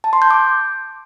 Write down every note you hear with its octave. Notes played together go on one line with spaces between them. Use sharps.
A5
C6
G6
D6